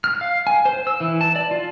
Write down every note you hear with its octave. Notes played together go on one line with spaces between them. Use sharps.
F6
F5
G#5
C5
E6
E3
A5
D5
F4